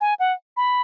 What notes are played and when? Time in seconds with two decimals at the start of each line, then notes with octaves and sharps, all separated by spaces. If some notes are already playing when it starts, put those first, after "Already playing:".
0.01 G#5
0.20 F#5
0.57 B5